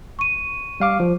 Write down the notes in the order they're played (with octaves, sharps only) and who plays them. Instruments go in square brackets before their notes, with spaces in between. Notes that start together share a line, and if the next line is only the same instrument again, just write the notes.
[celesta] C#6 D#7
[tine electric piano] G3 F5 D6
F3